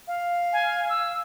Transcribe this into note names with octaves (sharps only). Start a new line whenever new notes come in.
F5
G#5
E6